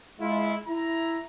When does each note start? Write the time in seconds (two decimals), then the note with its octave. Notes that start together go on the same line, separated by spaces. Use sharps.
0.20 G#3 E4 F4
0.67 E4 A#5